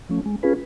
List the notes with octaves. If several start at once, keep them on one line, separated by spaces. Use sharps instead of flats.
F3 A3 C#4
G#3
C#4 F4 G#4 B4